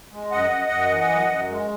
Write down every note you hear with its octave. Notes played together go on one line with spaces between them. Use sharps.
G#3
F#2 D#5 F#5
F#2
F#2
E3
F#2
F#2
G#3